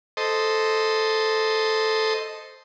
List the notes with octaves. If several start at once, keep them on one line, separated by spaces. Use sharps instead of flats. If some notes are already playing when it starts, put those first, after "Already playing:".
A4 C5 D#5